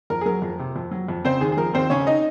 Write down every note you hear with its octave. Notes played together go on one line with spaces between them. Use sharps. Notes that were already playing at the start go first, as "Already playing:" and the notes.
F2 A#4
G#4
F#3 A#4
F2
C3
F2
F#3
F2
C#3 C4 C5
D#2 G#4
G#4
F3 A#4
D#2 C4 C5
C#3 C#4 C#5
D#4 D#5